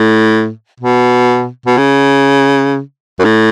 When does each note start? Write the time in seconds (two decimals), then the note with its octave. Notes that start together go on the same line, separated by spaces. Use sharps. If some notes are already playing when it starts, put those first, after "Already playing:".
Already playing: A2
0.80 B2
1.66 B2
1.78 C#3
3.19 F#2
3.24 A2